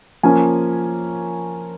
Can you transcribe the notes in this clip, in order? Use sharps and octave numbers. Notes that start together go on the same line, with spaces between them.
F3 A#3 C#4 G#5